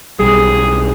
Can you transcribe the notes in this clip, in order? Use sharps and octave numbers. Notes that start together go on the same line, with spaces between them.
B1 G3 G#4